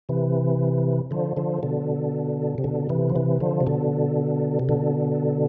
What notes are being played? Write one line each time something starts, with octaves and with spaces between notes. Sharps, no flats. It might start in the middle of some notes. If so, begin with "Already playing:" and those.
C3 E3
D3 F3
D3 F3
B2 D3
C3
B2 D3
C3 E3
F3
C3 E3
D3 F3
C3
B2 D3
C3
B2 D3